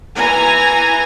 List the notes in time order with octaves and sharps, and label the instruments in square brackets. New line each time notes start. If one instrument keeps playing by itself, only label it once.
[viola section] E3 G#5 A#5